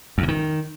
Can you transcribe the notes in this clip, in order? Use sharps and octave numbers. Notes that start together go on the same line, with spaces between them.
E2
A#2
D#3